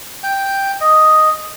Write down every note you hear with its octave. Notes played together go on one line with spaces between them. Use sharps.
G5
D#5